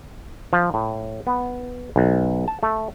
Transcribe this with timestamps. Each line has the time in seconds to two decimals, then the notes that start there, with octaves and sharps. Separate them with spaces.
0.53 F3
0.74 A2
1.27 B3
1.96 B1
2.48 A5
2.63 A3